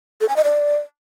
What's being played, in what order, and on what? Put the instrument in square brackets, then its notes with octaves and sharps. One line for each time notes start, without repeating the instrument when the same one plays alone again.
[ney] A4
G#5
D#5
D5